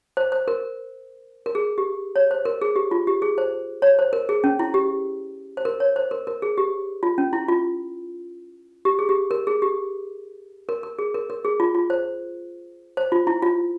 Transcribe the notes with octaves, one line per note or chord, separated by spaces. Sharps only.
C5
C5
A#4
A#4
G#4
G4
C#5
C5
A#4
G#4
G4
F4
G4
G#4
C5
C#5
C5
A#4
G#4
C#4
E4
G4
C5
A#4
C#5
C5
A#4
A#4
G#4
G4
F4
C#4
E4
F4
G4
G#4
G4
A#4
G#4
G4
A#4
A#4
G#4
A#4
A#4
G#4
F4
F4
C5
C5
F4
E4
F4